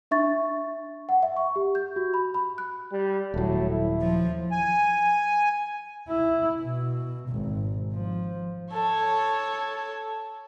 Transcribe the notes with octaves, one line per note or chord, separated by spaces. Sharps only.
D4 E5 C#6 A6
F#5
E5
C#6
G4
G6
F#4
B5
B5
F#6
G3
D#1 A2 F#3
E4
F3
G#5
E4
B2
G#1
F3
A4 C#5